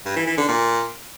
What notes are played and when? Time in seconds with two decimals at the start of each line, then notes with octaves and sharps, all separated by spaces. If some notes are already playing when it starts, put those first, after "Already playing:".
0.06 G2
0.16 E3
0.27 E3
0.38 D3
0.48 A#2